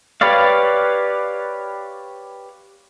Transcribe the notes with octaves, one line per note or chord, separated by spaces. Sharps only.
G4 B4 C#5 D5 F5